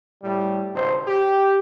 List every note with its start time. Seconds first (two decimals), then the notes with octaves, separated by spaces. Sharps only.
0.23 A2 G3
0.73 G#1 C#2 C5
1.06 G4